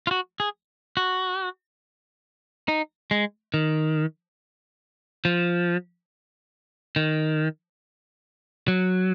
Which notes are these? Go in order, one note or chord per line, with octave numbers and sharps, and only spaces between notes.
F4
F#4
G#4
F#4
D#4
G#3
D#3
F3
D#3
F#3